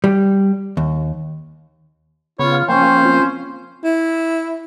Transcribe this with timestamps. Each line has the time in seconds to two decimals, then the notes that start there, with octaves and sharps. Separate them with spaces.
0.04 G3
0.77 D#2
2.39 C#3 B3 F4 C#5 B5
2.52 F5 F6
2.69 F3 A#3 C#4 C5 G5 G#5 C#6
3.04 C4 F4
3.84 E4